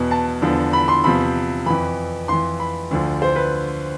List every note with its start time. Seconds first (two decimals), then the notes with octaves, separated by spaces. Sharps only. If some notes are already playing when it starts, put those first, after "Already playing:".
Already playing: E2 B2
0.11 A5
0.42 E2 D3 F3
0.73 B5
0.88 C6
1.04 E2 C3 F3 B5
1.66 F2 E3 B5
2.28 F2 E3 C6
2.60 B5
2.91 D2 D3 F3
3.22 C5
3.36 B4